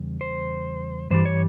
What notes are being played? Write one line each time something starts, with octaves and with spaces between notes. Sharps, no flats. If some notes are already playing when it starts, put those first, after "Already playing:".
Already playing: E2 C#3 G3
C5
G2 E3 G3 C5
C#5